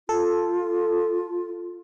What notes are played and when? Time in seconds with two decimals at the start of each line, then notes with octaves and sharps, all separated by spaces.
0.09 F4 A4